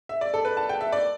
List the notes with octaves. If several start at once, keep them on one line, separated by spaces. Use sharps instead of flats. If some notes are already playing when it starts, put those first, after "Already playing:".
E5
D5
A4
B4
A5
G5
E5
D5